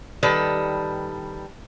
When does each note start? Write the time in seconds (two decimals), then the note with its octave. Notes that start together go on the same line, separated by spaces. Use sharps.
0.23 D#3 G3 A4 B4